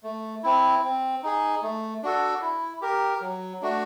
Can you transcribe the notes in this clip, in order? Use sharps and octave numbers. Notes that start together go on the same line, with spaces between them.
A3
C4 E4
C4
D#4 G#4
A3
D4 F#4 A4
E4
G4 A#4
F#3
A3 D4 F#4